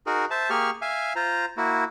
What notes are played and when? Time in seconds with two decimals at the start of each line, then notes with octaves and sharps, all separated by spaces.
0.06 D#4 F#4 G#4 A#4
0.31 C5 E5 A5
0.50 A#3 G4 G#4 C#6 F6
0.82 E5 F5 G#5
1.16 F4 C5 A#5
1.57 A#3 E4 F#4